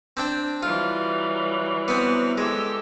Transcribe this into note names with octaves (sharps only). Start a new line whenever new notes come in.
C4 D4 G5
E3 F#3 G3 F4
B3 C4
G#3 G4 A4 E6